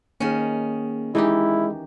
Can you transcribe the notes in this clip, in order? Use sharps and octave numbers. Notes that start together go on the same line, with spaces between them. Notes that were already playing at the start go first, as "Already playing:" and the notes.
D#3 A#3 C#4 G#4
E3 G#3 D#4 E4 G4 G#4 D#5